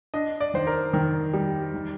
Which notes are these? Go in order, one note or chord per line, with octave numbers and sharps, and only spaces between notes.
D4 D#5
D5
D#3 C5
A#4
D#3 A#4
G3
D#3